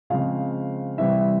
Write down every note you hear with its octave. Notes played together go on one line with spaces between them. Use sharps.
C#3 F3 G#3 C4 F5
C3 E3 G3 E5